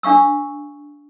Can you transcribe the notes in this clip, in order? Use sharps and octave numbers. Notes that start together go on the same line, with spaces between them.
D4 F5 C#6 E6